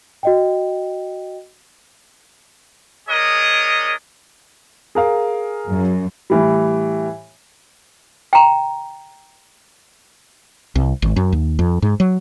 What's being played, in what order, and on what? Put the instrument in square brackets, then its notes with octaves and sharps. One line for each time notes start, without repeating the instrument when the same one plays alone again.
[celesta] F#4 D#5 G5
[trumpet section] D4 G#4 A#4 C#5 D#5
[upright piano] G#4 A#4 F5
[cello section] F#2
[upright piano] A2 E3 G3
[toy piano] G5 A#5
[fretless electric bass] C2
G#1
F#2
D#2
F2
G#2
F#3